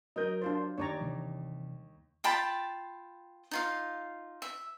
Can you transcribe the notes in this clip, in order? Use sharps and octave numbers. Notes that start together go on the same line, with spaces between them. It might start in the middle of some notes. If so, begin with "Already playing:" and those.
F#3 A#4 D#5 G6
D4 F4 C5
D#2 C#5 D5 A#5
C3 E3 G3
F4 G5 A5 B5
D#4 F4 F5
E5